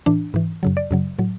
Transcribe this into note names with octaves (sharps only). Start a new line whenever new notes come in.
A2 E3 D4
G#2 E3
F#2 C#3 F#3
D5
F#2 C#3 F#3
A2 F#3